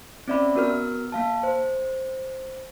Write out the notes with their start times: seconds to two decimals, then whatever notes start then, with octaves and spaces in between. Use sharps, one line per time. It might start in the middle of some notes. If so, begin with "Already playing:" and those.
0.28 C4 C#4 D5 E5 B5
0.55 B3 F#4 A#4 F6
1.12 A#3 F5 A5
1.43 C5